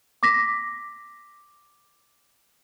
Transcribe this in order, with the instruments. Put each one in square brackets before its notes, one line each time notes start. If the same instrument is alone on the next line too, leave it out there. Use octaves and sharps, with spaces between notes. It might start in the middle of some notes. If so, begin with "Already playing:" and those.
[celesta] D6 A#6 B6